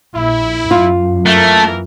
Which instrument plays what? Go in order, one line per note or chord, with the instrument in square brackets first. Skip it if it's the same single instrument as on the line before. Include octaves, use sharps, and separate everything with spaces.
[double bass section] A#1 [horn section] E4
[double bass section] F#2 [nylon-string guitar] F4
[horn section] E3 A#3 A#4 [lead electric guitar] A3